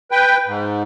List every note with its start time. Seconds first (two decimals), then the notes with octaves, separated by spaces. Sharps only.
0.11 B4 G5
0.46 G#2